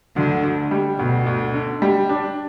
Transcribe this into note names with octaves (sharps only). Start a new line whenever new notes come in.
D2 D3
D2
G3
D2 B2
D2
D3
G3
D4